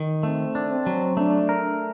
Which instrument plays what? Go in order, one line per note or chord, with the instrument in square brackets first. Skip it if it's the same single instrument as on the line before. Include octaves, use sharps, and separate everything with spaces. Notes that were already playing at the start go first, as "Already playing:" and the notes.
Already playing: [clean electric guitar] D#3
[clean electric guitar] A3 [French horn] C4
[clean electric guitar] D4
[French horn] C4
[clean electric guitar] F#3
[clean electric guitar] A3 [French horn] D4
[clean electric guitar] A#4